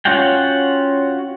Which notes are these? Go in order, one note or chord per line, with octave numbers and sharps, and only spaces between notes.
C#4 F4 F#4 F#5 G5